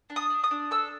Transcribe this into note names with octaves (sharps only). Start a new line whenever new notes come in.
D4
D#6
D4
D#6
D4
A4 E6